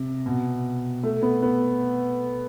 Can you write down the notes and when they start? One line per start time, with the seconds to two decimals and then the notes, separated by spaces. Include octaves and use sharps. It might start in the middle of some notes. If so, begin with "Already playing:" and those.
Already playing: C3
0.26 B2
1.03 A3
1.22 B3
1.42 B3